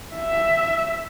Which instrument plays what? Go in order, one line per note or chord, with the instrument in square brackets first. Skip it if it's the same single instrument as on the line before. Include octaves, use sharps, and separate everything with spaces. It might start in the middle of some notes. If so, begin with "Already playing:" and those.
[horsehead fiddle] E5